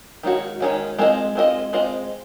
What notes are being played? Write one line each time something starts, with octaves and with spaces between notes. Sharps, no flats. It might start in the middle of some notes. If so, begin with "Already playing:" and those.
D#3 G#3 C#4 F#4
D#3 G#3 C#4 F#4
G#3 C4 F4 C5 D#5
G#3 C4 F4 C5 D#5
G#3 C4 F4 C5 D#5